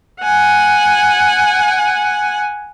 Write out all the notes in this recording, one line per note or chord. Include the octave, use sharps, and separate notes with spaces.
F#5 G#5